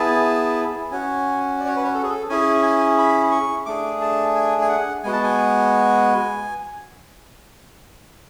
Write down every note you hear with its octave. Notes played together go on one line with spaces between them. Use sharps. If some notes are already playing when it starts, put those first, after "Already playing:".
Already playing: B3 E4 G#4 A5
C#4 F#4 G#5
D5
C#5
B4
C#5
A4
G#4
A4
C#4 E4 G#4 G#5
G#5
B5
C#6
A3 D4 G#4 D6
A5
G#5
G#5
F#5
G#3 B3 F#4 G#5
A5
G#5